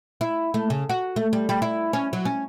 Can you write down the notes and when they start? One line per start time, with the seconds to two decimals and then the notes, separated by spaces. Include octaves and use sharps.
0.21 E4
0.54 A3
0.70 C#3
0.89 F#4
1.16 A3
1.33 G3
1.49 G3
1.62 E4
1.93 C#4
2.13 F#3
2.25 C#4